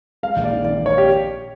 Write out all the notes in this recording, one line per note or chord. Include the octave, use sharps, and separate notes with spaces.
G#3 F5
A#1
D5
D#3
D#3 D5
A#1
C#5
G4